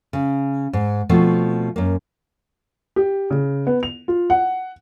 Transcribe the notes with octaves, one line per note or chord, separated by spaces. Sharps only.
C#3
G#2
B2 F3 A3 C4
F#2 A#3
G4
C#3
B3
F7
F4
F#5